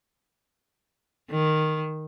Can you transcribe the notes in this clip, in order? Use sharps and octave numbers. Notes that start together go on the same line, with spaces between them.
D#3